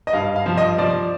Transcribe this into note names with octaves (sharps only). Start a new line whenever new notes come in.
D#5
G2 F5
F5
F3
D#5
F3 D5